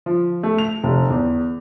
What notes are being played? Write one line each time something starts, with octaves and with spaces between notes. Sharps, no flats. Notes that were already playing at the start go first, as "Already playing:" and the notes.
F3
A3
F7
F1
E2